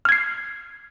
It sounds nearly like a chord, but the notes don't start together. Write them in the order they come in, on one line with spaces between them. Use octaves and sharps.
F6 G#6 C7